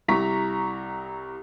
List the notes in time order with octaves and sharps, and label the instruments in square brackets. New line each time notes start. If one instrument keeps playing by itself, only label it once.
[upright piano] C2 E4 G4 A#5 C#6 B6